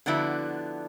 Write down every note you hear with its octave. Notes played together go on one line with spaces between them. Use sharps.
D3 F3 B3 D4 E4 F#4